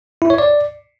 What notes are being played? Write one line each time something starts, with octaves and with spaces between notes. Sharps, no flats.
E4
C#5
D5